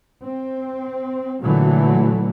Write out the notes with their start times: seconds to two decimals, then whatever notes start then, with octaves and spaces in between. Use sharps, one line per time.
0.23 C4
1.41 A#2 D3 E3 F#3 A3